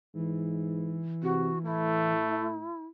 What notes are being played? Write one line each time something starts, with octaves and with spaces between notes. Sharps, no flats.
G#2 E3
C3 F#4
A2 A3 E4